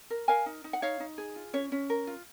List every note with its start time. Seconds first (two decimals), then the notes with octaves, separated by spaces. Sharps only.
0.10 A#4
0.28 A#4 F5 G#5
0.46 D#4
0.64 D#4
0.73 F#5
0.82 D#4 C#5 F5
1.00 D#4
1.18 G#4
1.36 F4
1.53 C#4 C#5
1.72 C#4
1.90 A#4
2.07 F4